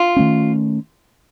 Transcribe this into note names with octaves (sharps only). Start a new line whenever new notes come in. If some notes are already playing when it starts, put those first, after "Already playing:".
Already playing: F4
D#3 A3 C#4